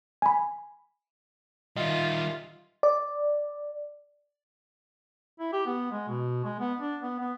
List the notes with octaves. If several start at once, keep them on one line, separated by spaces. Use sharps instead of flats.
G#5 B5
D#3 G3 F4 D#5 E5
D5
E4
G4
B3
G#3
B2
G#3
B3
D4
B3
B3